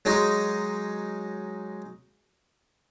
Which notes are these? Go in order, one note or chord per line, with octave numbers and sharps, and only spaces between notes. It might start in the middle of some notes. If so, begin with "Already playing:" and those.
F#3 G#3 D#4 C6